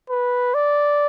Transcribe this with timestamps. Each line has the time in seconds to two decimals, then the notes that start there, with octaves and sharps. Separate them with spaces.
0.10 B4
0.54 D5